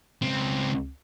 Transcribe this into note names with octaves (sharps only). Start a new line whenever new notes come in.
C#2 C4